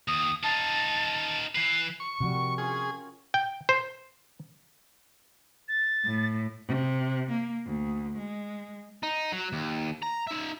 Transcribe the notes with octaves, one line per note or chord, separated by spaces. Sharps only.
D#2 D#6
D#4 F4 A5
E3 B4 C7
C#6
C3 F3 G3 F#4
A#4
C#4 F4 G#4 C#6
G5
C5
A6
A2
C3
A#3
D2
G#3
D#4
F#3
D#2
A#5
D#4 E5